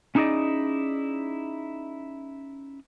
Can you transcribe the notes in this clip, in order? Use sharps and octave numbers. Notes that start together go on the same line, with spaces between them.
C#4 D#4 E4 G#4 D5 D#5